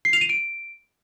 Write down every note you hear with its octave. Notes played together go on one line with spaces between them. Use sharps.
C7
F7
D#7
D7